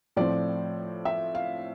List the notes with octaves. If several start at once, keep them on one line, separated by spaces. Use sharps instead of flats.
A2 F3 C4 D5
E5
F5